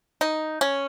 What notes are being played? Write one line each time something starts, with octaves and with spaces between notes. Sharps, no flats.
D#4
C#4